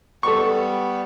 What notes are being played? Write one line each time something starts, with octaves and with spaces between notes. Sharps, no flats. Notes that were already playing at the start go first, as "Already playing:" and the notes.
G3 B3 A4 C#6